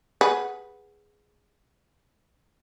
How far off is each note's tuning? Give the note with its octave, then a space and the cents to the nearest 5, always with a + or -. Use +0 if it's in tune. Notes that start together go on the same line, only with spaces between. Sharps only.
G#4 +0 B4 +0 F#5 +0